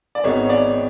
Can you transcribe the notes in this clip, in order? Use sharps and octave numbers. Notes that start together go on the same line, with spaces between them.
D5
G#1 G#2 G#3 B3 C#5
C#5
D5